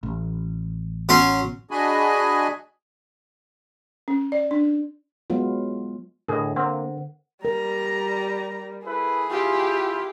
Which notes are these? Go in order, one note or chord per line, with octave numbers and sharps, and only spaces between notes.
A1
F#3 C#4 C6
D4 F#4 G#4 D#5 G#5 B5
C#4
D5
D4
F#3 G#3 B3 F4
A2 D3 G#4 A#4 D#5
A#3 C4 C5 F#5
G3 A#4 A#5
E4 G#4 A4 B4
E4 F4 G4